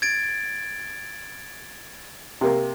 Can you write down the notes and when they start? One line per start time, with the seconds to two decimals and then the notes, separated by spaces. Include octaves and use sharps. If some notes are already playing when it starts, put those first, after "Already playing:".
0.02 G#6 A6 D7
2.41 C3 A#3